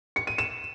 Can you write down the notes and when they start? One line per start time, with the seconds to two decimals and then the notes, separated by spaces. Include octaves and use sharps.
0.16 C#7
0.27 D#7
0.38 E7